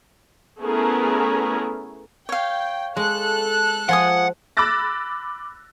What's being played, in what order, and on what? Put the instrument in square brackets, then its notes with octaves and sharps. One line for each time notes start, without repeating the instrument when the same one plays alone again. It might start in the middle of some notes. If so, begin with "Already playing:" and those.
[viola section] A3 B3 C#4 E4 G#4 A#4
[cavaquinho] C#5 F5 [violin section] G5
[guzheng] G#3 [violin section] A4 F#6
[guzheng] F3 [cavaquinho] F4 G#5 D#6 [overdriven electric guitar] F#5
[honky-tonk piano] B5 D6 E6 F#6 A6 A#6